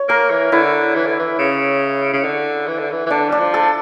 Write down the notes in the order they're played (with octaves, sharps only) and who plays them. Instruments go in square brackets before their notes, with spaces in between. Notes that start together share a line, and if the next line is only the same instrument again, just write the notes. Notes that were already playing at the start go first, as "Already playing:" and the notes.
Already playing: [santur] C#5
[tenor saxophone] A#3 [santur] A#4
[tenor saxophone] E3
[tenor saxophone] D3 [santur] E4
[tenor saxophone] E3
D3
E3
C#3
C#3
D3
E3
D3
E3
E3
[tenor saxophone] D3 [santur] D4
[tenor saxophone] G3 [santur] D4
[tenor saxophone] F3
[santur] A4